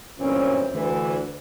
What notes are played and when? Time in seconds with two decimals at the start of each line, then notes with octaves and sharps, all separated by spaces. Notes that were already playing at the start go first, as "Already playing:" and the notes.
0.19 G1 F#2 A#2 E3 C4 C#4
0.72 D2 D3 E3